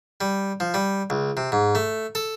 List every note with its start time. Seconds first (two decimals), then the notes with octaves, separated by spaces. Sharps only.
0.21 G3
0.60 F3
0.74 G3
1.10 C#2
1.37 C3
1.52 G#2
1.75 A3
2.15 A4